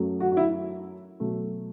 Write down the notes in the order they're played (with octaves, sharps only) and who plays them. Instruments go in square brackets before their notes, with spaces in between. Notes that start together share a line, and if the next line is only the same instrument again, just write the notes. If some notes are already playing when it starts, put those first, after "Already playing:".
Already playing: [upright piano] F#2 F#3 A3
F#4
F#4
E4
B2 F#3 A3